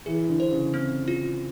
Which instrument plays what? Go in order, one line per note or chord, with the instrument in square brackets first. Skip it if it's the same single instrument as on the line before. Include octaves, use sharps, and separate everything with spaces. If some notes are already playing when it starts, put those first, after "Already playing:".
[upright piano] E3 [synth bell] G#4
[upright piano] D3
[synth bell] C5
[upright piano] C#3
[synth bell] C4
F4